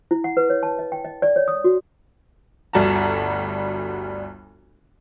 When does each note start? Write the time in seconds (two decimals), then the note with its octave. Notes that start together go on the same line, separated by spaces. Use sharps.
0.11 E4
0.24 F#5
0.37 B4
0.50 C#5
0.63 A5
0.79 D#5
0.92 G5
1.05 D#5
1.22 D5
1.36 C#5
1.48 D#6
1.64 F#4
2.73 G1 D2 G3 F#4 A5 A#5